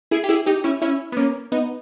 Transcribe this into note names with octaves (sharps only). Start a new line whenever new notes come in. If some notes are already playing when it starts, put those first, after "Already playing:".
E4 G#4
G4
E4 G#4
D#4 G4
C#4 E4
C#4 E4
B3
A#3 C#4
B3 D#4